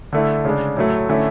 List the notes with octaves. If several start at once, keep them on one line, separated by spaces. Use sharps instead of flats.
D3 A3 E4
C#3 G#3 D4
A2 F#3 A3
D3 A3 C#4 E4